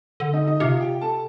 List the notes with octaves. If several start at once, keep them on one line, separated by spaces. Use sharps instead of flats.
D3
D#4 D#5
D#4 D#5
C3 F4 F5
G4 G5
A4 A5